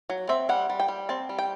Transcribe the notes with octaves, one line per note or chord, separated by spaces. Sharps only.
F#3
C4 E5
G3 F#5
G3
G5
G3
C4 A5
G3
G5